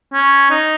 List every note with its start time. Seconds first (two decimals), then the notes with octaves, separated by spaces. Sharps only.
0.13 C#4
0.50 D#4